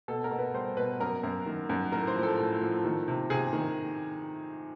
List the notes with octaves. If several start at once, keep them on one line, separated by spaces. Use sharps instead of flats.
B2 A4
A#4
B2
B4
G3 C5
B2 B4
F#2 A#4
F#2
D#3
F#2
A2 A#4
C5
F3
A4
A2
F3
D#3
C3
C3 G#4
D#3